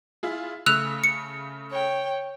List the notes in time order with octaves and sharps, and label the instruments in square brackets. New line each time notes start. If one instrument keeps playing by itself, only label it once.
[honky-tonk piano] E4 F4 G#4
[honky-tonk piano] C#3 A3 [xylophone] E6 F#6 F7
[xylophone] C#7
[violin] C#5 G5